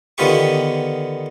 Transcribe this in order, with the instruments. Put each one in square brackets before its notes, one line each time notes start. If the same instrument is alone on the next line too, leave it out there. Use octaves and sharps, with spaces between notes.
[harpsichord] D3 D#3 B3 F4 G4 C#6